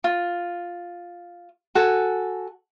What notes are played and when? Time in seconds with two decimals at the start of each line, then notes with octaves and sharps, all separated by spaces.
0.04 F4
1.75 F#4 A4 G#5